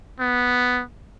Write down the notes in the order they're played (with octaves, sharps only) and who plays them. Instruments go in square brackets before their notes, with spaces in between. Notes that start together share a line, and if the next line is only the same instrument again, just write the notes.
[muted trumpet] B3